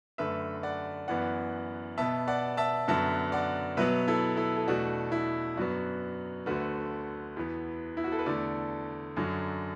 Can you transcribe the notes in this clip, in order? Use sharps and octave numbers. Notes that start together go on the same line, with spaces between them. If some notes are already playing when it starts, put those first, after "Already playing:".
F#2 D3 A3 B4 E5
D5 F#5
F#2 E3 B3 D5 F#5
B2 B3 E5 A5
D5 F#5
E5 A5
F#2 D3 F#3 B3 E5 A5
D5 F#5
B2 F#3 B3 B4 E5
E4 A4
E4 A4
A4
E2 B2 A3 D4 F#4
E4
F#2 F#3 B3 D4 F#4
D2 D3 A3 F#4 B4
E2 E3 B3
E4
F#4
A4
B4
E2 D3 A3 A4 D5
F#2 D3 F#3